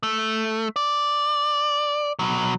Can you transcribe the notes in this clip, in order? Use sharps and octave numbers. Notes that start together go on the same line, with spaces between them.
A3
D5
B2 F#3